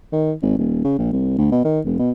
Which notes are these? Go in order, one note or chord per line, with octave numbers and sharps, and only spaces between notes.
D#3
G#1
D#1
C#3
A#1
C2
D2
B2
D#3
F1
B2